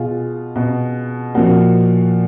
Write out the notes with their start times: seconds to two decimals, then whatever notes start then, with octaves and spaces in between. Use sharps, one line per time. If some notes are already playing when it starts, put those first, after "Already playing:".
Already playing: B2 F4 G#4
0.56 B2
1.34 A#2 F3 F#4 A#4